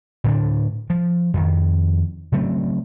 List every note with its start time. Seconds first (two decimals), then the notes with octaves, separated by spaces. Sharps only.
0.24 A2 D3 D4
0.90 F3
1.34 F2 D#3
2.32 C#3 F#3 A3 C4